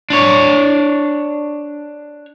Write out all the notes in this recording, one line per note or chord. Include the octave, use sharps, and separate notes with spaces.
D4 C#5